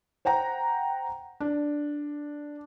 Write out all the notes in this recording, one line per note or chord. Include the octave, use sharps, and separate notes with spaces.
C5 F#5 G5 A#5
D4